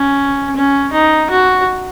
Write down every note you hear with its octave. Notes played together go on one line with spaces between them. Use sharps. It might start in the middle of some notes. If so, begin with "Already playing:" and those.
Already playing: C#4
C#4
D#4
F#4